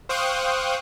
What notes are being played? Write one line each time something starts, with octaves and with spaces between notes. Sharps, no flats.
C5 F5 G5 C#6 D#6 F#6